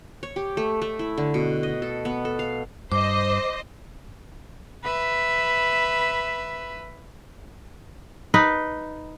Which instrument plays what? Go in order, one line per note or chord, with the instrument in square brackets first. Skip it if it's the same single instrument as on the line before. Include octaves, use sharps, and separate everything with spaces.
[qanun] C#5
G4
A3
A3
E4
D3
B2
D#5
A4
B3
A4
F5
[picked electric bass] G2 [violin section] C5 D#5 [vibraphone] D6
[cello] B4 E5
[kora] D#4 B4